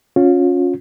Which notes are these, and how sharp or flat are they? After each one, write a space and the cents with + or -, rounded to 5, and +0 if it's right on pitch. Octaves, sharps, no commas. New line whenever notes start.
C#4 +0 F4 +35